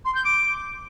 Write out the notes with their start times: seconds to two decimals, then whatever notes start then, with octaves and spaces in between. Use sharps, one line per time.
0.04 C6
0.14 G6
0.24 D6